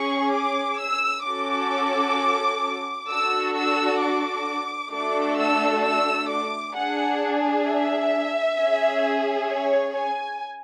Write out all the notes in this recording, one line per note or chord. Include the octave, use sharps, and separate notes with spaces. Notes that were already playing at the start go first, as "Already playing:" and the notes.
Already playing: C#4 G#4 C#6
D6
E6
C#4 F#4 A4 D6
D4 F#4 A4 E6
E6
D6
A3 D4 F#4 A4 D6
E6
E6
D6
D4 G#4 F#5
E5
C#4 G#4
C#5
G#5